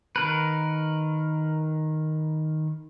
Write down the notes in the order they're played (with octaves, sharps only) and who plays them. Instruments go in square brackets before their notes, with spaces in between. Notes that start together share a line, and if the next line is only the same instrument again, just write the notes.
[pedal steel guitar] D#3 A#4 B4